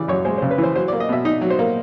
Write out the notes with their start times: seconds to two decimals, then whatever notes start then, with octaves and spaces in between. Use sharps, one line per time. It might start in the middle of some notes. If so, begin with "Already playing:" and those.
Already playing: C#3 E3 D5
0.08 F#2 C#5
0.25 G#3 C5
0.38 C5
0.42 C#3
0.51 B4
0.58 E3
0.63 C5
0.75 F#3 C5
0.88 D5
0.93 A#3
1.00 D#5
1.09 B2 E5
1.25 D#4 D#5
1.41 F#3
1.50 C5
1.59 A#3